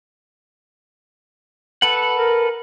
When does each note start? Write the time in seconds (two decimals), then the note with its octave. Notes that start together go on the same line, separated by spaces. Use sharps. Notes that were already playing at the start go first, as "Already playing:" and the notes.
1.82 A4 B4 F#5
2.17 A#4